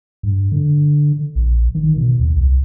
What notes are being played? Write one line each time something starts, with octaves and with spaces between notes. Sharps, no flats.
G2
D3
A#1
D#3
B2
D#2
C2